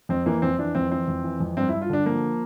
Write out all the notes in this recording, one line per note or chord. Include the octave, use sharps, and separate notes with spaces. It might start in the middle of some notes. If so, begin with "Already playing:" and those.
F2 C4
E3 A#3
F2 C4
E3 D4
F2 C4
E3 C4
F2
E3
F2
G2 C4
E4
G2
F4
D3 D4
F3 A#3